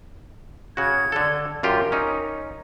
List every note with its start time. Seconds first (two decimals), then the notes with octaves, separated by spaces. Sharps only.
0.77 C#3 F#4 G#6
1.12 D3 A4
1.63 F#2 F4 G4 A#4
1.92 C#4 D#4